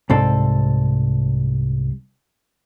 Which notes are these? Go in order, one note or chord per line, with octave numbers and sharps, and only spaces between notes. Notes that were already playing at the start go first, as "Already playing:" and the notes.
C2 G#2 C4 A4